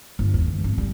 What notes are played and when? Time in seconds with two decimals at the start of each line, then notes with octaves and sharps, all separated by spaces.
0.19 G1
0.34 E2
0.48 G#3
0.64 G#1
0.78 G3